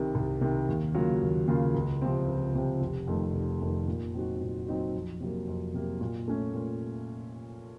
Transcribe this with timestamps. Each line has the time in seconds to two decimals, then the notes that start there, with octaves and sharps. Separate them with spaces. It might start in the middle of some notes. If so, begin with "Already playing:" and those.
Already playing: C2 C3 D#3
0.15 C2
0.41 C3 D#3
0.69 D#2
0.94 C#3 F#3 A#3 F4
1.21 D#2
1.48 C#3 F#3 A#3 F4
1.75 C#2
2.02 C3 F3 C4
2.28 C#2
2.54 C3 F3 C4
2.81 F1
3.08 F2 D#3 A3
3.34 F1
3.61 F2 D#3 A3
3.88 A#2
4.14 F#3 C4 D#4 F#4
4.41 A#2
4.67 F#3 C4 D#4 F#4
4.94 F2
5.20 C3 F#3 A#3
5.48 F2
5.74 C3 F#3 A#3
6.01 A#2
6.28 A3 C#4
6.54 A#2